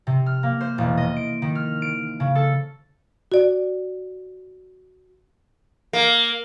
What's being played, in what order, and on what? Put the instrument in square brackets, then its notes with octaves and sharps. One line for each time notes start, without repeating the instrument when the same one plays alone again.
[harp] C3
F6
A#3
C5
E1
D#5
D7
D#3
F6
D7
C#3
A4
[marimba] F#4 D5
[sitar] A#3